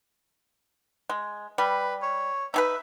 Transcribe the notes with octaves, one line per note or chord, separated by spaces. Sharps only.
G#3
G3 B4
C#5
D#4 G#4 B4 E5